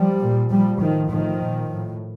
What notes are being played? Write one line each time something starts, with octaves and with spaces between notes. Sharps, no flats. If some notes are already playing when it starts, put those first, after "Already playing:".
Already playing: F3 G3
A#2
A#2 F3 G3
A2 D#3 F3
A2 D#3 F3
A#2
A2